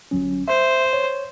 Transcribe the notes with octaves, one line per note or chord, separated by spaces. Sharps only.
G1 F#3 C#4
C5 E5
C#5